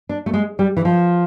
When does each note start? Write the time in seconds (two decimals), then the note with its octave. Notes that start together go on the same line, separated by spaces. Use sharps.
0.09 D4
0.26 A3
0.34 G#3
0.59 G3
0.77 E3
0.85 F3